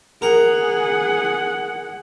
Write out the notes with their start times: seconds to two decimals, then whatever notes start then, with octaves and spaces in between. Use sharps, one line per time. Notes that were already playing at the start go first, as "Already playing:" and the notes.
0.22 G#4 A#4 F#5